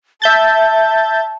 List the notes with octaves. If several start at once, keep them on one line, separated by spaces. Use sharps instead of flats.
E5 A5 G6 A6